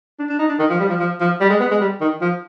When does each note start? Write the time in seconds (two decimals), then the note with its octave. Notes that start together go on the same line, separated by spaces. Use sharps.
0.19 D4
0.29 D4
0.39 D#4
0.49 D4
0.59 D#3
0.70 F3
0.80 G3
0.89 F3
1.00 F3
1.21 F3
1.40 G3
1.50 G#3
1.60 B3
1.71 G#3
1.81 G3
2.01 D#3
2.21 F3